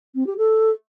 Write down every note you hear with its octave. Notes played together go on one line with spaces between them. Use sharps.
C4
G4
A4